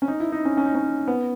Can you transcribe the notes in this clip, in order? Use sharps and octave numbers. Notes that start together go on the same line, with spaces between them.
C#4
D#4
E4
D#4
C#4
C#4
D#4
C#4
B3